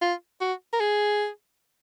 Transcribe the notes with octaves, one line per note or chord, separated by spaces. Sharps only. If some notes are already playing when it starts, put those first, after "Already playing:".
F4
F#4
A#4
G#4